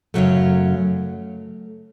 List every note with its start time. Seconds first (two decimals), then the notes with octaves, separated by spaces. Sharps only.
0.14 F#2 C#3 F#3 A3